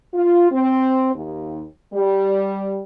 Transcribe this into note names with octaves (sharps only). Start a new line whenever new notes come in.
F4
C4
D#2
G3